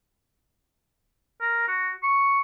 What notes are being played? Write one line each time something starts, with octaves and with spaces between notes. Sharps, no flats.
A#4
F#4
C#6